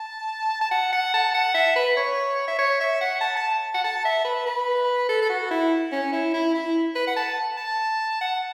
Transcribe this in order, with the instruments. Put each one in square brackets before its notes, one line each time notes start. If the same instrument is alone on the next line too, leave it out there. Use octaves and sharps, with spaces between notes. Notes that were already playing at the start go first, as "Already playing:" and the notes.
Already playing: [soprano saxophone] A5
A5
F#5
F#5
A5
F#5
E5
B4
C#5
E5
C#5
E5
F#5
A5
A5
F#5
A5
E5
B4
B4
A4
A4
F#4
E4
C#4
E4
E4
E4
B4
F#5
A5
A5
F#5